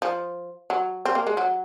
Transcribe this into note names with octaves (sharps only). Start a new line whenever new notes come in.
F3
F#3
C4
A#3
G#3
F#3